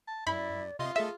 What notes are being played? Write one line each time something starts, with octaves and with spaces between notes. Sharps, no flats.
A5
F#2 E4 D5 B5
C3 F4 D#5 E5 C6
A3 G#4 A4 D#5 E5